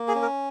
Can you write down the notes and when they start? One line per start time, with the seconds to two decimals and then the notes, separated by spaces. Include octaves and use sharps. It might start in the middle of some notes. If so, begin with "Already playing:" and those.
Already playing: A#3
0.08 G#4
0.15 C#4
0.22 A#4